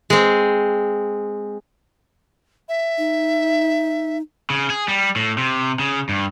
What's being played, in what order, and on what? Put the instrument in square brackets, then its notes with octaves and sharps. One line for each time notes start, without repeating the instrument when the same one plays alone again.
[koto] G#3 C4
[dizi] E5
[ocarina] D#4
[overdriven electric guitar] C#3
G#4
G3
A2
C3
C#3
G2